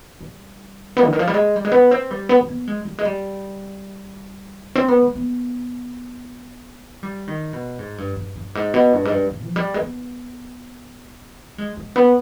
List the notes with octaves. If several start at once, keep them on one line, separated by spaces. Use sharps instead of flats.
G3
B3
D3
D#3
F3
G3
G#3
G3
G#3
B3
C4
G3
B3
G#3
B3
G#3
G3
G#3
G3
C4
B3
G#3
B3
G3
D#3
B2
G#2
G2
G2
G2
G#2
B2
G2
G#2
G2
G#2
F3
G3
G#3
B3
G#3
G#3
B3